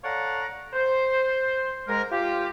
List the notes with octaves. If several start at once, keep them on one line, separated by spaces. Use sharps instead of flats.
A4 C#5 D5 F5 F#5 A#5
C5
G#2 G#3 A#4
F4 G4